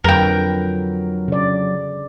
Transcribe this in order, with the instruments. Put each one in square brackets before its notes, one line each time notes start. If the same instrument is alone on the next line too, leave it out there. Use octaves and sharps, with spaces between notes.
[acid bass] F2 [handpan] D3 B4 [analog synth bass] F#3 [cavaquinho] A#4 G5
[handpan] C#3 D5